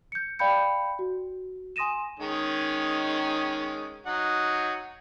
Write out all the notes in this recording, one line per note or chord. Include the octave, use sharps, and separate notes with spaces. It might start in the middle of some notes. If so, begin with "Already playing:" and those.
G6 C#7
D5 F5 G5 B5 G6 C#7
F#4
G#5 C6 D#6 A#6 D#7 E7
D#3 G#3 C#4
F#3 D#4 F#5